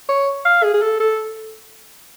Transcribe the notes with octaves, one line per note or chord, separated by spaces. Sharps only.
C#5
F5
G#4
G#4
A4
A4